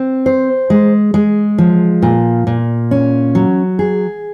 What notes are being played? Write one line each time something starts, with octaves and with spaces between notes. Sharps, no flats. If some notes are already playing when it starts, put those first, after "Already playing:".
Already playing: C4
C5
G#3
G#3
F3
A#2
A#2
C#4
F#3
G#4